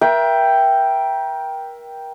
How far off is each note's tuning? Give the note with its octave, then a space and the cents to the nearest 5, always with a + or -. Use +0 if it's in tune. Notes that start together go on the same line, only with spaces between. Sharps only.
A#4 +30 E5 +15 G5 +0